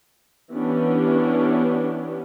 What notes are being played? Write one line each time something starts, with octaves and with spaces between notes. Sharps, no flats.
E3 B3 C#4 D4 G4